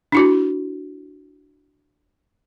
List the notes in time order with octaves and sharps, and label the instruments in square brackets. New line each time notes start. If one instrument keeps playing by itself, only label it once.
[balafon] D4 E4 F#4